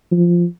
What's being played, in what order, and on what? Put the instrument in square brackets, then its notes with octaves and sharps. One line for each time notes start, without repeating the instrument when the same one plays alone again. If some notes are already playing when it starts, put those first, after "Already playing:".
[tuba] F3